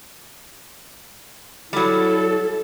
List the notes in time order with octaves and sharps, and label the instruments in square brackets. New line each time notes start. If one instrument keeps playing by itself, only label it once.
[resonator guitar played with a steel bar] F#3 G3 [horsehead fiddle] E4 A4